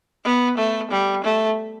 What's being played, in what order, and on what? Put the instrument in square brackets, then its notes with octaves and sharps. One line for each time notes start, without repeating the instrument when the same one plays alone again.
[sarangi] B3
A3
G3
A3